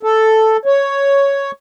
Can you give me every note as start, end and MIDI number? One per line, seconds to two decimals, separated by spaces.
0.03 0.57 69
0.66 1.51 73